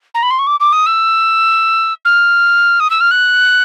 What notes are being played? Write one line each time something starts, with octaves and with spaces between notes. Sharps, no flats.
A#5
B5
C6
C#6
D6
D6
D#6
E6
F6
D#6
E6
F6
F#6